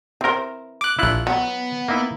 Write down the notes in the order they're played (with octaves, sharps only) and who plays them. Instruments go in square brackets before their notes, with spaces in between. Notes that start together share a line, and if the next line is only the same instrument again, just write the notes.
[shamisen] E3 C5 [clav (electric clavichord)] C4 A#4
[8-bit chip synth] D6 F#6
[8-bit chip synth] A#1 F#6 [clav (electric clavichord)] E4 F4
[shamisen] F#3 [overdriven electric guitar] B3
[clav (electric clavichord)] A#3 D#4 E4